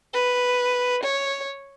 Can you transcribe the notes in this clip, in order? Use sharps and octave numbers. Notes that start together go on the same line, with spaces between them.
B4
C#5